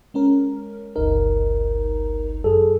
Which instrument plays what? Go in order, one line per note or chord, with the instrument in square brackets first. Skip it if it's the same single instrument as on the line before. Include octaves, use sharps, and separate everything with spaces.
[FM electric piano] G#3 C#4 A#4
[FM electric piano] G1 C#2 D#4 [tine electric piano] A#4
[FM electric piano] F#2 [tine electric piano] G#4 A4